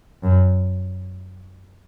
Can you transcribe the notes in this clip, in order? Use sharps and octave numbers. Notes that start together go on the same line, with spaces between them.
F#2